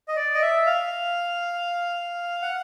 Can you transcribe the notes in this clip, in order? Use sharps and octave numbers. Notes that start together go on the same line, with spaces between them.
D#5
D5
D#5
E5
F5
F#5